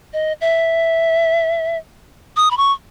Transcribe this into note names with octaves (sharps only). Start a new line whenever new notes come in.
D#5
E5
D#6
B5
C#6